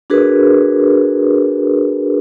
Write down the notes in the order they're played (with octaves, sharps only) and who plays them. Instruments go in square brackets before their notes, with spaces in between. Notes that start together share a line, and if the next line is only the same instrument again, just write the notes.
[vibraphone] D4 F#4 G#4 A#4 B4